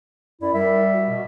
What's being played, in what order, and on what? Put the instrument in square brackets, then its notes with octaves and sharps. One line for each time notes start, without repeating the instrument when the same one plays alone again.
[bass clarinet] F#2 [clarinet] E4 [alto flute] D5
[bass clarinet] G3 [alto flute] A#4 [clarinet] E5
[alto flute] F#4
[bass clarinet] B2